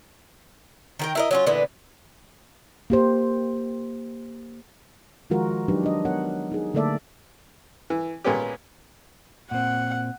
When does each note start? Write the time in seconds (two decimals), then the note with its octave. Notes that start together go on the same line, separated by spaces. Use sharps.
0.99 D#3 A#4 G5
1.15 E4 A#4 D#5
1.31 F#3 C#4 F4
1.46 A#2 D3 E3 B3
2.90 A#3 G4 C5
5.30 D#3 F3 G#3 F4 F#4 A#4
5.68 F#3 D4 D#4 G4 B4
5.83 D4 D#5
6.05 B3 A#4 C#5 F#5
6.52 D#4 G#4
6.74 D3 A3 A#3 A4 D5 E5
7.90 E3
8.24 A#2 G#3 B3 C#4 G4
9.51 A#2 C4 F#5